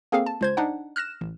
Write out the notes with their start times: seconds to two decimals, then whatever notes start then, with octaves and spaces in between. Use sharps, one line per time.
0.12 A#3 C4 G#4 A4 F5
0.26 A5
0.41 C#2 C5 G#6
0.57 D4 D#4 F#5
0.96 F6 F#6 A#6 E7
1.21 A1